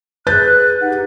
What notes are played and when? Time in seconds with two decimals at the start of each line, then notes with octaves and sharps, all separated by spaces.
0.27 G#4 B4 F#6 G6 A6
0.81 D#4 G4 F#5